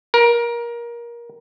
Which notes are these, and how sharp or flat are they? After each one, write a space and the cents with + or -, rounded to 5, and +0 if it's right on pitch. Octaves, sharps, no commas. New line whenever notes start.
A#4 +20